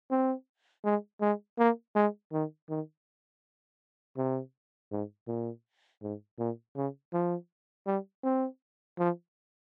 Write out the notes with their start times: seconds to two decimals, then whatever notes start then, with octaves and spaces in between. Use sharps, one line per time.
0.11 C4
0.84 G#3
1.21 G#3
1.59 A#3
1.96 G#3
2.33 D#3
2.69 D#3
4.17 C3
4.92 G#2
5.28 A#2
6.03 G#2
6.39 A#2
6.77 C#3
7.13 F3
7.87 G3
8.24 C4
8.99 F3